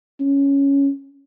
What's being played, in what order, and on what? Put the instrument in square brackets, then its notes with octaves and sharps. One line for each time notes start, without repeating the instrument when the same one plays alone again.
[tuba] C#4